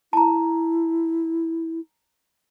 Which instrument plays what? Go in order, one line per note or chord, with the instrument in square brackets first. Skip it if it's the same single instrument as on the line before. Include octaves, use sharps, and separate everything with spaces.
[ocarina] E4 [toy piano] A5 A#5